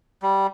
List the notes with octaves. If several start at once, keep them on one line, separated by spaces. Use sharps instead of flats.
G3